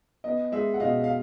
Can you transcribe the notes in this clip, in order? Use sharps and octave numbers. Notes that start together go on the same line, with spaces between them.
B3 D#5
G#3 E5
F#5
B2 D#5 F5
F5